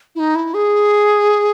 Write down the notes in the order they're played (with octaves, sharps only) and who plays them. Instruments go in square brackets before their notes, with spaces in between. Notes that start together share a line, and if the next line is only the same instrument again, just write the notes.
[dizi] E4
D#4
E4
G#4